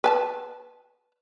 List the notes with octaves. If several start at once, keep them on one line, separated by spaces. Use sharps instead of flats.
B4 G#5 A5